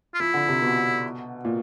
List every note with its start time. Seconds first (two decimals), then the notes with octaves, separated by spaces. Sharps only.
0.14 F4
0.20 F3 E4
0.34 D3
0.49 C3
0.62 B2
1.45 A#2